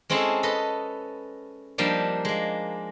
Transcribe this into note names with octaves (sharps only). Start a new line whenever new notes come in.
G#3 C4 C#4 E4 G#4 A4
A4 B4 D#5
F3 G3 A#3 D4 D#4
G#3 A#3